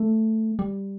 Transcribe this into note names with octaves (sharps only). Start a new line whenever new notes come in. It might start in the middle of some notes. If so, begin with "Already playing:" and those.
Already playing: A3
G3